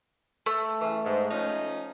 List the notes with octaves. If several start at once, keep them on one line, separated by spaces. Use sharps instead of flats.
A3
C#3 E3
G#2
F3 C#4 D#4